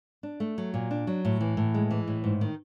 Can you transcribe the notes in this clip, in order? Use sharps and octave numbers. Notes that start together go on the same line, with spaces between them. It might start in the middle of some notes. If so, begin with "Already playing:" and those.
D4
A3
F#3
A#2
D4
F#3
A2
E3
A2
G#3
E3
A2
G#2
D#3